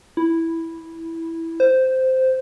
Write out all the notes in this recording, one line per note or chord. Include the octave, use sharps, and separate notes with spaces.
E4
C5